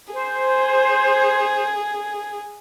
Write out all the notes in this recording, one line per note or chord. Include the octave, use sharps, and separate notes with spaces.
G#4 C5